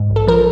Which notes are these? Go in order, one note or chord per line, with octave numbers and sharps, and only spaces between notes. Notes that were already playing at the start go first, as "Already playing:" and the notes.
Already playing: G#2
A#1
A4
F3 A#4